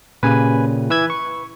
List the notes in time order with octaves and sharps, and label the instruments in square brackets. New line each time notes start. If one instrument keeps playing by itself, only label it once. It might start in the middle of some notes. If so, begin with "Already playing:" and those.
[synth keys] A#2 C#3 G4 [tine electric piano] B4 G#5
[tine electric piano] E3 E6 G#6 [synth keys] B4
[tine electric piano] C#6